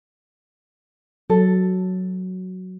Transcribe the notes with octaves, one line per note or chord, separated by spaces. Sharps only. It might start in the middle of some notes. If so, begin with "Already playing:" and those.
F#3 A4